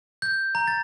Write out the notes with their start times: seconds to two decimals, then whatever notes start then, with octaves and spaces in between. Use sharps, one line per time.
0.22 G6
0.55 A#5
0.67 A6